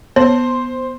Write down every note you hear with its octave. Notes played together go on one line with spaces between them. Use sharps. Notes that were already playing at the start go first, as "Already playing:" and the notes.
B3 C5